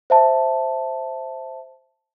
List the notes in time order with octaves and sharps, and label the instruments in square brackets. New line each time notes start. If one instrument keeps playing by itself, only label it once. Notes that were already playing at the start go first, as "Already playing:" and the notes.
[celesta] C5 E5 A5